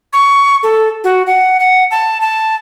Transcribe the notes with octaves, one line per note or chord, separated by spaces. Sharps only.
C#6
A4
F#4
F#5
F#5
A5
A5